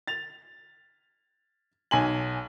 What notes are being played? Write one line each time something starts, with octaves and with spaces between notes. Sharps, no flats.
A6 F7
B1 G#5 F#7